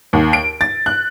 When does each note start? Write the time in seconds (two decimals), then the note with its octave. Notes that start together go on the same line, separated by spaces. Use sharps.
0.13 D#2
0.33 D7
0.61 A6
0.86 F#6